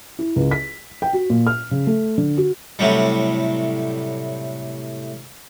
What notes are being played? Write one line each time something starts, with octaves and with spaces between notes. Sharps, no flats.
E4
C#2
B6
G5
F#4
A#2
F6
C#3
A3
D3
F#4
A2 C3 F#3 G3